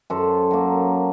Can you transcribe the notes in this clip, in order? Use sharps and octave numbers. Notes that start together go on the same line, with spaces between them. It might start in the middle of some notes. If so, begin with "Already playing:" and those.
F#2 A4 C5
F#3 A#3